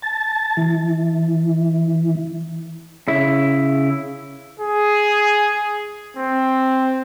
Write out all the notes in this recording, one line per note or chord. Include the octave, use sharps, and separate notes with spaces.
A5
E3
C#3 E4
G#4
C4